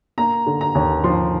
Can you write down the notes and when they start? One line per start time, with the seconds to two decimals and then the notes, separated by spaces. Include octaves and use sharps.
0.18 A#3 A#5
0.47 D3
0.61 A#5
0.75 D#2
1.04 F3 C6